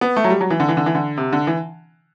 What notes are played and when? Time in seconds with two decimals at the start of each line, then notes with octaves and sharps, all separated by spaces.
0.01 B3
0.16 A3
0.24 F#3
0.30 G3
0.41 F#3
0.50 E3
0.60 D3
0.69 E3
0.77 D3
0.86 E3
0.95 D3
1.17 C3
1.33 D3
1.47 E3